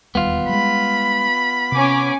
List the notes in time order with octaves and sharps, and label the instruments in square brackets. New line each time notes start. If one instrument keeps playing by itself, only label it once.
[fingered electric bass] E1 D#2 G3 [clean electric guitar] B3 F4
[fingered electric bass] G3 G#3 [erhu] B5
[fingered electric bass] C3 [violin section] C#4 G#5 D6